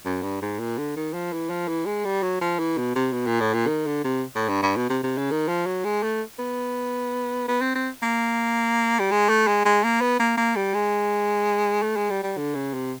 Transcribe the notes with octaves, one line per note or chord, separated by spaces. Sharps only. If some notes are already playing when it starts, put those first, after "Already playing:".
F#2
G2
G#2
A#2
D3
D#3
F3
E3
F3
E3
G#3
G3
F#3
F3
E3
B2
C3
B2
A#2
A2
A#2
D#3
D3
C3
A2
G2
G2
B2
C3
C3
C#3
D#3
F3
F#3
G#3
A3
B3
B3
C4
C4
A#3
G3
G#3
A3
G#3
G#3
A#3
B3
A#3
A#3
G3
G#3
A3
G#3
G3
G3
D3
C#3
C3